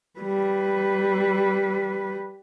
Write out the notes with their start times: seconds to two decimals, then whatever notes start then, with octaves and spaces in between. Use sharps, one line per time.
0.19 G3 B4